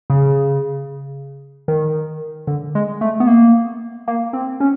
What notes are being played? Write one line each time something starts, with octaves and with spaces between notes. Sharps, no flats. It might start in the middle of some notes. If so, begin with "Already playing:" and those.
C#3
D#3
D3
G#3
A3
B3
A#3
A#3
C4
C#4